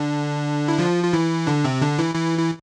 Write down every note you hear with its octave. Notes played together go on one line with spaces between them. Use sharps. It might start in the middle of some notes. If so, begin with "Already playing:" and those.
Already playing: D3 D4
E4
F3 F4
F4
E3 E4
D3 D4
C3 C4
D3 D4
E3 E4
E3 E4
E4